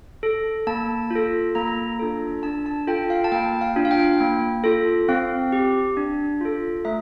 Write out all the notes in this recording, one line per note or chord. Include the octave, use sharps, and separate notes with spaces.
A4
A#3 A5
F4
A4
A#3 A#5
D4 F4 A4
D4 A5
A5
F4 A4 G5
F5
A5
A#3 G5
F5
D4 F4
F5
G5
A#3
F4 A4
C4 F5
G4
D4
F4 A4
A3 E5